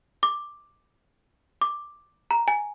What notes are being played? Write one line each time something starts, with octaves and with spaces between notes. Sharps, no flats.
D6
D6
A#5
G#5